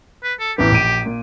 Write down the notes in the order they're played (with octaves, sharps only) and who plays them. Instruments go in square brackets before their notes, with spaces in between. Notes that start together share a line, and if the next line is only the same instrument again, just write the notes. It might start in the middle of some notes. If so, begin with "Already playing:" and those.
[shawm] B4
A4
[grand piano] A1 E3 B3 [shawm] G4
[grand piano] A#1 D7 D#7
A#2